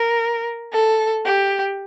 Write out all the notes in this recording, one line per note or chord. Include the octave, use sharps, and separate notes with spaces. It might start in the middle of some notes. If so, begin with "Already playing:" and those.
Already playing: A#4
A4
G4